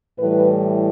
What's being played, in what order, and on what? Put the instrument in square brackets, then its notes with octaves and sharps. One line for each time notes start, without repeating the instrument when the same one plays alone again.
[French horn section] A2 E3 G3 B4